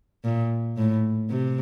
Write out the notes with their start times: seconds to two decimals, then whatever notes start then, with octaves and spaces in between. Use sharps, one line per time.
0.24 A#2
0.77 A2
1.30 C3